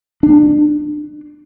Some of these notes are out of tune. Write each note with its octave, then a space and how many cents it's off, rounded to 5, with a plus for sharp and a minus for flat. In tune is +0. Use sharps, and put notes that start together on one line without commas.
D4 +25